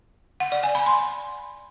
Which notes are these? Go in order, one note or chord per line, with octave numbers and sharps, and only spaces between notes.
F#5
D5
G#5
B5
C6